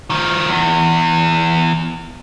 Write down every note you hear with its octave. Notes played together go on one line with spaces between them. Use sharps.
D#3 F3
E2